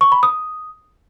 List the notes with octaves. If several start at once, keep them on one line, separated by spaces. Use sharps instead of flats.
C#6
B5
D#6